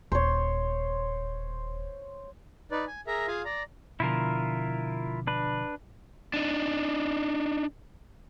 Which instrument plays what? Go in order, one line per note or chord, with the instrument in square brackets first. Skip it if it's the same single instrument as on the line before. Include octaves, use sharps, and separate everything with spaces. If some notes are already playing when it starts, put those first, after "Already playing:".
[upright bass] D#1 [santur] C5 C#5
[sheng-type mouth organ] D#4 B4 D5
G#5
G#4 A#4 E5 A#5
F4 G#4 F5 G#5
D5 A#5
[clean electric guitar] B2 D3 F3 [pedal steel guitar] E4 F4 A#4
[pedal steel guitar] D4 B4
[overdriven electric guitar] D4 D#4